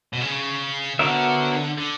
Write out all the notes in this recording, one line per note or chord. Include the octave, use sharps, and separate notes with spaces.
B2
C#3
D3 B3 F#4 A#4 C#5 E5
D3